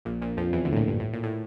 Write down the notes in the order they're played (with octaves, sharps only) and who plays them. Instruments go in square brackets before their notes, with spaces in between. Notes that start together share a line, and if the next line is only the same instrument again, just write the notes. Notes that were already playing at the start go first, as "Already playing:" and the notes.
[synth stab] A#1 A#2
A#1 A#2
F2 F3
E2 E3
D2 D3
A2
A#1 A#2
G2
A2
A#2
A2